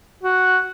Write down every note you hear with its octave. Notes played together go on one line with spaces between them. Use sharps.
F#4